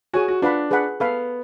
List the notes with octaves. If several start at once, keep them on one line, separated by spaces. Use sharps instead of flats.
F#4 G#4 C#5 G#5
F#4
D4 F4 B4 F#5 B5
G#4 B4 F#5 B5
B3 A4 F5 B5